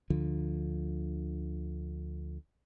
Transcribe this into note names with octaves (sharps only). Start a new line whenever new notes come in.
D2 D3 F3